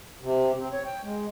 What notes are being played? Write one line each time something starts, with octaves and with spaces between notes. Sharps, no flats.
C3
C4
C#5
G5
G#3